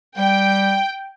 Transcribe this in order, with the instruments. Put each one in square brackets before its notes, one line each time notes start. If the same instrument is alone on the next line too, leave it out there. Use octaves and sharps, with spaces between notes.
[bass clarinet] G3 [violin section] G5